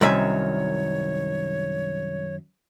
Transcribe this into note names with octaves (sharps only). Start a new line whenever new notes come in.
C2 F#2 D#3 C#5 E5 G#5